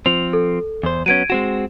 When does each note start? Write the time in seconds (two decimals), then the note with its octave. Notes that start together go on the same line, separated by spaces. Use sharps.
0.06 F3 C4 F7
0.33 A4
0.83 E2 C5
1.06 F#3 B3 C#4 G#6 D7 D#7
1.30 G#3 C4 F#4 E7